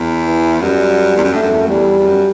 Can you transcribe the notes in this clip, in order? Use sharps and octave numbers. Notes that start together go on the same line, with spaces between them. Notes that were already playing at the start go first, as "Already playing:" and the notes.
Already playing: E2
E3
F#2 G3
E2
F#2
G2 A3
F#2
E2
F#2
E2 G3
E2
F#2